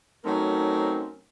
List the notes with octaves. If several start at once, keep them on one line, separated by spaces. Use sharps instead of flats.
F#3 A3 C4 C#4 D#4 A#4